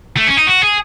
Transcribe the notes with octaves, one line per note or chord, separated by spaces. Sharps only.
A3
C#4
D#4
F#4
G#4